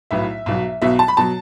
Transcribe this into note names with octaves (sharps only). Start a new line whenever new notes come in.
B1 A2 F#3 B3 E5
B1 B2 F#3
B1 B2 F#3 E5
A5
B5
B2 F#3 A5